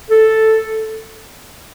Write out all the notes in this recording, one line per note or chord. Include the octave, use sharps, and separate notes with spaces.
A4